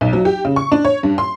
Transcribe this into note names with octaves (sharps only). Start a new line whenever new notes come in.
B1
F#3
G4
C#3
C#6
D4
C#5
G2
C6